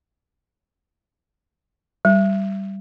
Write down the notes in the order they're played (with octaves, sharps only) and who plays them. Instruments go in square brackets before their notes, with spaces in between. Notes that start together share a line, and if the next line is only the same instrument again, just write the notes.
[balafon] G3